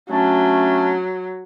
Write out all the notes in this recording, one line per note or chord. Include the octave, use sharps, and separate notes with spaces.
F#3 A3 C#4 D4